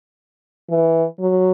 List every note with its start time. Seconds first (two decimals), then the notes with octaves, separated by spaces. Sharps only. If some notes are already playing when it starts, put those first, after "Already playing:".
0.70 E3
1.19 F#3